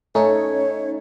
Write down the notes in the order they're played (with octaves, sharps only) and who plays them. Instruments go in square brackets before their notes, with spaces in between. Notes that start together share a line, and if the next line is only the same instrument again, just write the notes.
[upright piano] A3 [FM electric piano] C#4 D#4 [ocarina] C#5